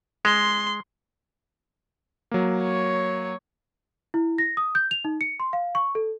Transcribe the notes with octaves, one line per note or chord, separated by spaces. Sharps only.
G#3 C6
F#3 A#3
C#5
E4
A#6
D#6
G6
F7
D#4
C#7
C6
F5
C#6
A4